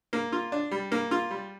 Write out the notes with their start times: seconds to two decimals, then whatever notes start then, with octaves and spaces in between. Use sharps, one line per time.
0.13 A#3
0.32 F4
0.52 D4
0.71 G3
0.92 A#3
1.11 F4
1.31 G3